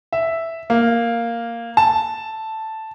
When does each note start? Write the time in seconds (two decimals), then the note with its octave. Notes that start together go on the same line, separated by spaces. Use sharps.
0.13 E5
0.70 A#3
1.77 A5